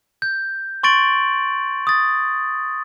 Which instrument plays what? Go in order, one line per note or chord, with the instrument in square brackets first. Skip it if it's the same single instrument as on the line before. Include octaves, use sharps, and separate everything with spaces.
[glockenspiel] G6
C6 C#6 A6 D7 F#7
D#6 A6